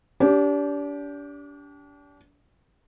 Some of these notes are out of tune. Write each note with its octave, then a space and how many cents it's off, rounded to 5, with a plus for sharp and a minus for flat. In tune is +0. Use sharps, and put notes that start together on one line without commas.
D4 -35 G4 -5